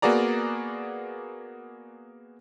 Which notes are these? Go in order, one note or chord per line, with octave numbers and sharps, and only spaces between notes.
A#3 B3 F#4 G#4 D5 A#5